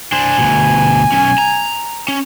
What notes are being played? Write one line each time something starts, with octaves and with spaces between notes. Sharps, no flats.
D4 C5 G#5
D2 B2
B1 C#4
A#5
C#4